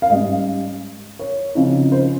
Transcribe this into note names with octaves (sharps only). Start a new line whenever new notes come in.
F5
G#2 G3 C#4 D#5
C#5
C#3 F3 C4 D#4
C5